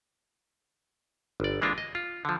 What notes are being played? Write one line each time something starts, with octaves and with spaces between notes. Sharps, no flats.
G1 D5
E3 G#3 A#3 D4 F4
D#5
F4
D3 F3